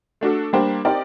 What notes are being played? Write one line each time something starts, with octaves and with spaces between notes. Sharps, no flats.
A3 D4 F#4 A4
G3 A#3 D4 G4 C5
C4 D#4 G4 A#4 D5